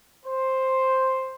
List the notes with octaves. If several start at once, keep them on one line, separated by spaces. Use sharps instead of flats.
C5